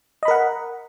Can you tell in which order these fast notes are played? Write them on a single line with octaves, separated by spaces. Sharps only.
D#5 B5 A#4 F#5